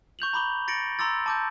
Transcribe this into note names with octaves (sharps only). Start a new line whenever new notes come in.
C#6 G6 F7 F#7
A#5 B5 D6 G7
A6 A#6 C#7 D7 F#7
A#5 C6 D6 E6 A6
A5 D6 G6